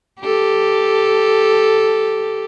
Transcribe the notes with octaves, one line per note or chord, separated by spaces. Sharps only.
G4 A4